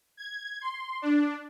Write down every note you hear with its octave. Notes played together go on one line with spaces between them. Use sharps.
G#6
C6
D4